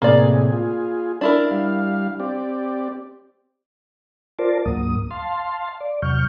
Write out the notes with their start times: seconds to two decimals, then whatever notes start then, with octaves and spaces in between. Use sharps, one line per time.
0.02 A2 C3 A#3 G#4 D5
0.52 F4 G#4
1.21 D4 E4 A#4
1.51 G3 F5
2.20 C4 G4 D5
4.39 F4 A#4 C5 D5 A5
4.65 D2 G#2 F#3 A#3 D#6
5.11 F5 A5 C6
5.81 D5
6.02 E2 C3 F#3 C#6 F6 G6